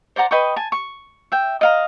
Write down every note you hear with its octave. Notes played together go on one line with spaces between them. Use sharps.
C5 D5 F#5 A#5
B4 D#5 G5 C#6
G#5 A5
C#6
E5 G5
D#5 F5 A#5